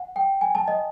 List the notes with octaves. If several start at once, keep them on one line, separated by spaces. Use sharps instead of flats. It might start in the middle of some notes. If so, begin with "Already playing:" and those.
Already playing: F#5
G5
G#5
A5
D#5